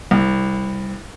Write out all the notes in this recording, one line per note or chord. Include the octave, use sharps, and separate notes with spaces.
C2